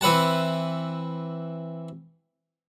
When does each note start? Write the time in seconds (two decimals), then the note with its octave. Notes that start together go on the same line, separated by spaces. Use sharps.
0.01 E3 C4 B4 F#5 A5